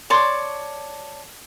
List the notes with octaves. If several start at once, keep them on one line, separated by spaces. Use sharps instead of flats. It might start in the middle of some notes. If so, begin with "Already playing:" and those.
C#5 D5 A5 C6